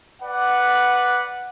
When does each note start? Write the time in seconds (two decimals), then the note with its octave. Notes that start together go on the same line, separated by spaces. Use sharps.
0.22 B4 D5 F#5